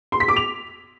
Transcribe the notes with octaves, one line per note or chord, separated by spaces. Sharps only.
C6
B6
D6
F7